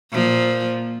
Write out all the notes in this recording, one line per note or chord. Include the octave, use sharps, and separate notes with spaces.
A#2 F3